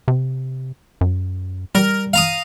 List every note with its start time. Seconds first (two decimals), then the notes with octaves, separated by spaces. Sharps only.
0.08 C3
1.01 F#2
1.75 G3 A#4
2.13 F5 A#5 D#6